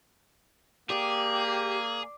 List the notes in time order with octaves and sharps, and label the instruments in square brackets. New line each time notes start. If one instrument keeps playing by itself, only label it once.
[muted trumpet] A#3 [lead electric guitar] G4 [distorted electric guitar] G#4 [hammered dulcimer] D5